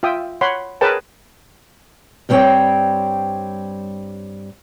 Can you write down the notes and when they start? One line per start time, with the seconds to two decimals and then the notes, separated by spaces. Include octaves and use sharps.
0.03 F4 E5 G5 D#6
0.41 C#5 F#5 B5 C6
0.81 G#4 A#4 B4 C#5 G5 A5
2.29 G2 G3 B3 C4 C#5 G5